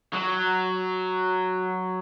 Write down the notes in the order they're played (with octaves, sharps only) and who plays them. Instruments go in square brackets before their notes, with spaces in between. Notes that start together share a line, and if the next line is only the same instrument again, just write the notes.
[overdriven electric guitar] F#3